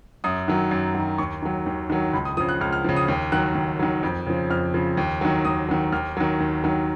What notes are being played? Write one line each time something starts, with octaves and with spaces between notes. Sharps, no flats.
F#2 D#6
D#3 F#3
F#2
D#3 F#3
D#2 C#6
D#3 F#3
D#2
D#3 F#3
C#2 B5
D#6
C#3 F3 D#6
F#6
C#2 F6
F6
C#3 F3
D#6
D#2
D#3 F#3 F#6
D#2
D#3 F#3
F2
C#3 F3
F2 F6
C#3 F3
D#2
D#3 F#3
D#2 D#6
D#3 F#3
D#2 F6
D#3 F#3
D#2
D#3 F#3